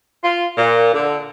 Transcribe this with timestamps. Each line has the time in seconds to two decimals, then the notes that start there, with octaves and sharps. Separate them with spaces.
0.24 F4
0.58 A#2
0.94 D3